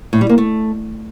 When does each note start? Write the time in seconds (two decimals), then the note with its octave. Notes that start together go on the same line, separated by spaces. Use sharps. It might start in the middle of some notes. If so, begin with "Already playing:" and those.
0.13 A2
0.21 G3
0.29 A#3
0.38 A3